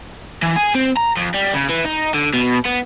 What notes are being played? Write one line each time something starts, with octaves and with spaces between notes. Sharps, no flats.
E3
G#4
C4
A#5
F2
G3
C#3
E3
D#4
D3
B2
B3